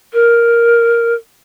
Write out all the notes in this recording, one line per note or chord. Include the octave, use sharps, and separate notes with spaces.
A#4